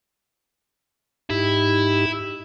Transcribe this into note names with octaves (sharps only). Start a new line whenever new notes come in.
G#2 D#4 E4 G4